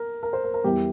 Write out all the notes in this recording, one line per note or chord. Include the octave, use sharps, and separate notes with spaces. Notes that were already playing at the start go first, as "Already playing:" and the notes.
Already playing: A#4
A#4
C5
A#4
A#4
E2 E3 G3 G4